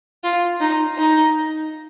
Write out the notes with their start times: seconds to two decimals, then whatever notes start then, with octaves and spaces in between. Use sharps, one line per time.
0.24 F4
0.61 D#4
0.98 D#4